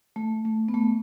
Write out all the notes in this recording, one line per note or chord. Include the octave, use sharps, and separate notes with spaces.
A3
A3
B3
A3